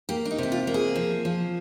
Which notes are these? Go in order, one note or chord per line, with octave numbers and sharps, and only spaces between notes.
A#3 G4
D4
D#4
C3 G4
F4
A#3
G#4
F3
F3